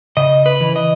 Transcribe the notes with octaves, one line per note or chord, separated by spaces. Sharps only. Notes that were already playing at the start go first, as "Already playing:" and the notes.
C#3 D#5
B4
E3
D#5